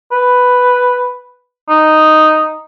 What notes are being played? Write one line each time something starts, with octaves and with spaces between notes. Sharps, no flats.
B4
D#4